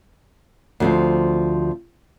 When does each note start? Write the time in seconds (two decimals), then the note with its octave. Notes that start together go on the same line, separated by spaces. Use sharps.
0.80 D2 F3 C4